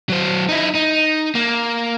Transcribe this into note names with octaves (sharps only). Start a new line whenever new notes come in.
F#3 C5
D#4 E4
D#4
A#3